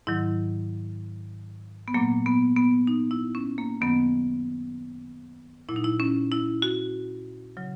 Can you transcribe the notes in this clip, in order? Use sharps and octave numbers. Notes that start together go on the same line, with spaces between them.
G#2 D#3 F#3 E4
B3
A#2 F#3 A#3
B3
B3
D#4
E4
C#4
A#3
F#2 D#3 F#3 B3
A#2 F#3 E4
D#4
E4
C#4
E4
F#4
C#3 F#3